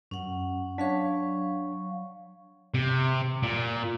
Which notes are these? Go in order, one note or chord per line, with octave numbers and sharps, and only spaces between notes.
F#2 C#4 F#5
F#3 D4 C#5 F5 C#6
C3
A#2